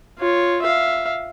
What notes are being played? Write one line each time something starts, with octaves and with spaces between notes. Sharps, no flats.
F4 C#5
E5 F5